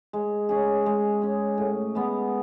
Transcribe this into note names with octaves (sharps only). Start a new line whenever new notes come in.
G#3
C#4 G#4
G#3
C#4 G#4
A2
G#3 B3